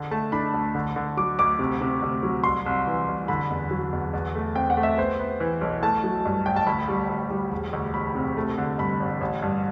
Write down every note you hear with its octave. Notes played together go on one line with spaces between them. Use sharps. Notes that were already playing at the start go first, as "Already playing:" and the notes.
Already playing: D3
A3 A5
D4 B5
D2
D3
D3
F#3 D6
D2 D6
C3
C3
D2
F#3
C2 C6
C2
E3
C2
D3 B5
E2
F#3
E2
E2
A3
C4 G5
F#5
A3
E5
B3 C5
B3
E3
B1
A3 A5
F#3
G2
A1 G5
A5
D2 B5
G3
D2
G3
E1
D2
E1 B5
C3
A3
D3
G2 B5
A1
A1
G2